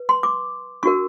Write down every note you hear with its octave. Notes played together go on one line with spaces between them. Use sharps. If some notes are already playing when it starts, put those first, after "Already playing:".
Already playing: B4
C6
D6
D4 F#4 A#4 C#6